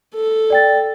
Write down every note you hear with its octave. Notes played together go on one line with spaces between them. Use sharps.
A4
D5 G5 A6